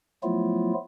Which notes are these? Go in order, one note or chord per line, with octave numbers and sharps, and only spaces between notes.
F3 F#3 A3 B3 E4 F4